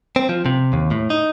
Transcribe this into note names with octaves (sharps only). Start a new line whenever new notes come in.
C4
F3
C3
D#2
A2
D#4